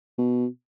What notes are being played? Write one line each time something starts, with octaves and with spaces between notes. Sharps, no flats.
B2